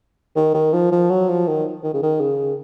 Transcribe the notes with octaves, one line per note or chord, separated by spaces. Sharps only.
D#3
D#3
F3
F3
F#3
F3
D#3
D#3
C#3
D#3
C#3